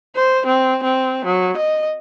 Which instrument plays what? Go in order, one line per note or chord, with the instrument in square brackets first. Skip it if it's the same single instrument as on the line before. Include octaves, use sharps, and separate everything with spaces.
[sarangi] C5
C4
C4
F#3
D#5